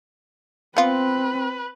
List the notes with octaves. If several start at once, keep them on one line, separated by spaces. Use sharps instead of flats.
B3 C4 F4 B4